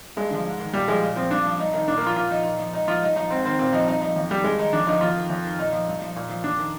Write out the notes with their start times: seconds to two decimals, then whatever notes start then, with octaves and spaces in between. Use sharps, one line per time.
0.17 G2 G#3
0.30 D3 F3
0.46 G#2
0.59 D#3
0.74 A#2 G3
0.88 F3 G#3
1.02 A#2
1.16 F3 C4
1.31 G2 D4
1.45 F3
1.59 G2 D#4
1.73 D#3 D#4
1.88 A#2 D4
1.97 A#3
2.02 F3 F4
2.16 A#2 F4
2.30 F3 D#4
2.45 A#2
2.60 F3
2.74 G#2 D#4
2.88 F3 F4
3.02 G2 D#4
3.16 F3 D#4
3.30 G#2 C4
3.45 D#3 C4
3.59 A#2 C4
3.73 F3 D#4
3.87 G2 D#4
4.02 F3 D#4
4.16 F2
4.31 D#3 G3
4.44 G2 G#3
4.58 D#3 D#4
4.73 F2 D4
4.87 D3 F3 D#4
5.01 F2 F4
5.16 D#3
5.30 F2
5.44 D#3
5.59 A#2 D#4
5.73 F3
5.88 G2
6.02 F3
6.16 A#2
6.30 F3
6.44 F2 D4
6.58 D#3